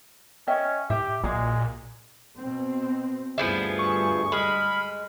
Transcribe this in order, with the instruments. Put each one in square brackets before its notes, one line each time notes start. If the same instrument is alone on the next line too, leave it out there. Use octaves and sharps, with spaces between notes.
[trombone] C#4 [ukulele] D#5 E5 G5
[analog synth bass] A2 [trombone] G4 [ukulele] E5
[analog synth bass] B1 [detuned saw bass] A#2 [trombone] G#3 [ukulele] F#4 G#4
[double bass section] B2 C4
[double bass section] D2 G2 [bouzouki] F3 B3 E4 [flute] G#4
[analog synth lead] C#6
[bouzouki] G#3 [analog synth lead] B5 [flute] F6